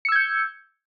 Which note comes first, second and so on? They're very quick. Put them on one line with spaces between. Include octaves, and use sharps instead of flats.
C#7 E6 G#6 G6